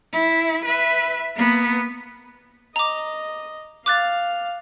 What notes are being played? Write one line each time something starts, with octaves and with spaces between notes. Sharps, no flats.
E4
B4 E5
A#3 B3
D#5 A#5 D6
F5 D6 F#6 A6